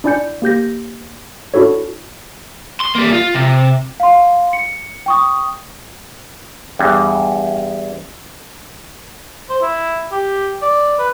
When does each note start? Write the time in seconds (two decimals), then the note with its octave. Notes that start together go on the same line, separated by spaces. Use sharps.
0.04 D4 E4 D5 G#5 G6 C#7
0.42 A#3 G4 G6 A#6
1.54 D4 E4 F#4 A4 C#5
2.81 C6
2.96 G3 A#3
3.14 F4
3.35 C3
4.00 F5 C6
4.53 C#7
5.06 G5 C#6 D#6
6.79 E2 G2
9.49 C5
9.62 E4
10.12 G4
10.62 D5
10.99 B4